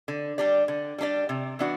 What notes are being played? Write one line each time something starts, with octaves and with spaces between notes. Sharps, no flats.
D3
G3 D4 G4 D5
D3
G3 D4 G4 D5
C3
E3 B3 D4 F#4